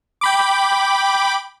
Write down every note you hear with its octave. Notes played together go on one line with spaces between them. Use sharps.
G5 B5 D6